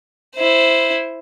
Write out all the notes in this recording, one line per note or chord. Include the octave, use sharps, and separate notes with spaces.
E4 C5